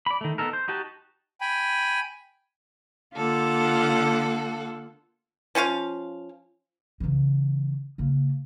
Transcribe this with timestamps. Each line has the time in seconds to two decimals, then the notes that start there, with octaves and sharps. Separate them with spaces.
0.06 D5 B5
0.21 D#3 A3
0.38 B3 D#4 A4 A#4
0.53 C5
0.68 D#4 F#4 G4 A5
1.41 G5 G#5 B5
3.14 D3 A#3 F4 A4 F#5
5.55 F3 C#4 F4 F5
7.00 C#3 E3
7.98 C#3 A#3